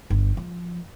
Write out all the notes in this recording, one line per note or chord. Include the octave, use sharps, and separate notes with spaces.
G1
F3